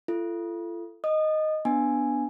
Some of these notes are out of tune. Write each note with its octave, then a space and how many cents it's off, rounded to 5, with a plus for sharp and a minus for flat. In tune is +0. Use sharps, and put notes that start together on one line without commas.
F4 -40 A4 +0
D#5 +0 D#6 -30
B3 +0 D4 +0 G#5 +0